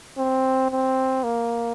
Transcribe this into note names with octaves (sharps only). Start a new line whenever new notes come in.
C4
C4
A#3